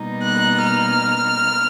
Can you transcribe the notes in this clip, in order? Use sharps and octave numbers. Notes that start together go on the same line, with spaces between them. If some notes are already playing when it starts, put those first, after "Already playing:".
Already playing: B2 G3 A#3 D#4
F#6
F6